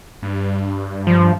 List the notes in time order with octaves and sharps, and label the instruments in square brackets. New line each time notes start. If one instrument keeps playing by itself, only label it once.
[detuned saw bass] G2
[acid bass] F3